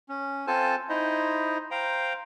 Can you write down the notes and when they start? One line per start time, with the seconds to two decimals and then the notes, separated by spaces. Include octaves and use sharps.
0.09 C#4
0.47 C4 F4 A4 C5 G#5 A5
0.89 D#4 E4 C5 D#5
1.71 C5 F5 G5 A#5